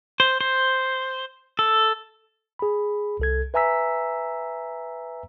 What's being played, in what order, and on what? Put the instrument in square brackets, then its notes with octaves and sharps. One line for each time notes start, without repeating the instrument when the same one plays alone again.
[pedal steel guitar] C5
C5
A4
[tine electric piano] G#4 B5
C2 A4 G#6
B4 E5 G#5 A#5 E6 B6